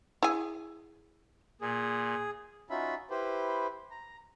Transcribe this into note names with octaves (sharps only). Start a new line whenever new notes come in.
E4 G#4 G#5
A#2 G#4
C#4 D#4 F4 F#4 E5 B5
E4 G4 B4 C5
A#5